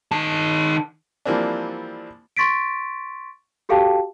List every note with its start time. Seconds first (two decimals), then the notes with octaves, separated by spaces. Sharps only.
0.12 D#3 A5
1.25 E3 F3 G3 A#3 C4 D4
2.37 C6 C#6 A6 B6 D7
3.69 F#4 G4 A4 F5 G5 A5